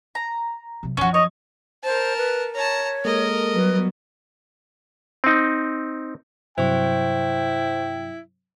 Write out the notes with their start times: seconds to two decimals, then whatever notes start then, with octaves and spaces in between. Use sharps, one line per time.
0.15 A#5
0.83 C3 F#3
0.97 F#2 F3 C#4 F#4
1.14 C#5 D#5
1.84 A#4 C5 A5
2.17 B4
2.55 C#5 A5 A#5
3.05 G#3 A#3 A4 A#4 D#5
3.55 F#3 G3 B3 B4
5.24 C4 D#4
6.58 G2 C3 F#3 E4 C5 G5 C#6